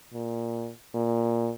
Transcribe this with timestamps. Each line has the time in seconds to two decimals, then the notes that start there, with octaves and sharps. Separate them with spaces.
0.13 A#2
0.94 A#2